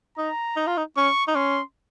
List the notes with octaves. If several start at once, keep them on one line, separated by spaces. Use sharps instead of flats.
D#4 A#5
D#4
F4
D#4
C#4 C#6
D#4
C#4 C6